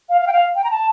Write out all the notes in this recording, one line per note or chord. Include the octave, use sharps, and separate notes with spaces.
F5
F5
G5
F5
G5
A#5
A5